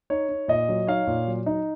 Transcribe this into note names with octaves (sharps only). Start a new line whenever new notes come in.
D#4 C#5
D#4
A#2 D#5
F#3
D#4 C#5 F5
A#2
F#3
D#4